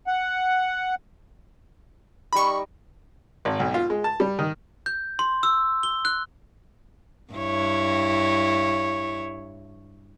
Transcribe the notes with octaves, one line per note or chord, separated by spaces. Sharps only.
F#5
G3 D#4 A#4 B5 C#6
G#1
B1
F4
G#3
A5
G3
D#3
G6
C6
E6
G7
F#6
G2 E4 C#5